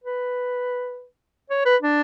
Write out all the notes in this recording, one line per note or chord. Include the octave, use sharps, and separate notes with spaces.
B4
C#5
B4
D4